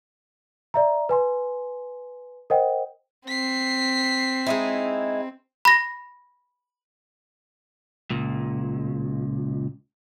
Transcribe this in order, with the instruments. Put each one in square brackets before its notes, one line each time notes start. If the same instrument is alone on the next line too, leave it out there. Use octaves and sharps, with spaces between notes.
[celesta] D5 E5 A#5
B4 G#5 C6
A#4 C5 D#5 F#5 G5
[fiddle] C4 [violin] B6 C7
[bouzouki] G#3 D#4 E4
[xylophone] B5 A#6
[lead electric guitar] C#2 A#2